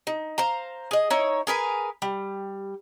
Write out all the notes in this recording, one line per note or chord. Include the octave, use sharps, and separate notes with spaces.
D#4
C5 F5 A#5
G#4 D#5
D#4 E4 C#5
G#4 A#4 B4 G#5
G3